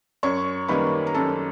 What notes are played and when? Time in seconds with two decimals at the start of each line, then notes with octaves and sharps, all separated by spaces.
0.23 F#2 C#5 C#6
0.68 D#3 G3 A#3 C#4 B4 B5
1.07 A#5
1.14 F#2 A4 A5